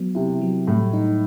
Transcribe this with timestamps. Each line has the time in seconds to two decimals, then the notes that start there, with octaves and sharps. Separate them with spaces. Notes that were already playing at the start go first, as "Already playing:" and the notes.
Already playing: F#3 B3
0.15 C3 E4
0.41 F#3
0.67 A2 G3
0.93 D#4